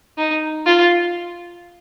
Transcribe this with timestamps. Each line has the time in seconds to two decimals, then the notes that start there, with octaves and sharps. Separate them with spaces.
0.18 D#4
0.66 F4